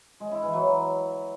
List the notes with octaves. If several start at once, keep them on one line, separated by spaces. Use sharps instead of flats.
G#3
E4
E3
F#3